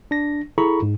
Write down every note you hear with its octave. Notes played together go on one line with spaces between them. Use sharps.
D4 A#6
E4 G#4 A4 A#5 B5 C#6
G#2